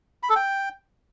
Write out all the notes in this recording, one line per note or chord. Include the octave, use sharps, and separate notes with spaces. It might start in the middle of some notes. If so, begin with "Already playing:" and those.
B5
A4
G5